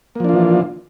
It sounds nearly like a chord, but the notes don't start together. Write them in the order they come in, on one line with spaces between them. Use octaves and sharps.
A#3 F3 D4 F4 E3